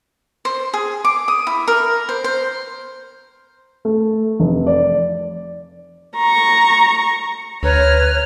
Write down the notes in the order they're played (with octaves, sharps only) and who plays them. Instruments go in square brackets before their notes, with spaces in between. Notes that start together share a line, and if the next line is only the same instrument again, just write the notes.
[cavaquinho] C5
G#4
D6
D#6
E4
A#4
C5
C5
[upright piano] A3
F1
D5
[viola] A#5 C#6
[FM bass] D2 [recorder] B4 [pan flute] C#5 [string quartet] A#5 F6